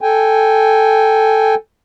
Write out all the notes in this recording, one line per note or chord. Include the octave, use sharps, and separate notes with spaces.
A4 G5 G#5